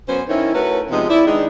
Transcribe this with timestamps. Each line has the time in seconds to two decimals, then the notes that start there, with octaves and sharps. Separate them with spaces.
0.08 F#2 B3 C#4 C5
0.29 D#3 C#4 E4
0.54 A3 C#4 F#4 A#4 B4
0.91 C3 F3 G#3 B3 D#4 D#5
1.09 E4 D5
1.27 D#3 G#3 D4 D#4